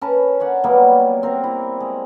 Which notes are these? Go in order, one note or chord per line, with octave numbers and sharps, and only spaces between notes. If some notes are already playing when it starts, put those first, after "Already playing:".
C#4 A#4 B4 A5
C#5 D5 F#5
F#3 G3 A#3 B3
C4 A#4
E4
G#3